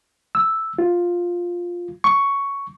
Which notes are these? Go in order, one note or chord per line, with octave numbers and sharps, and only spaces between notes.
E6
F4
C#6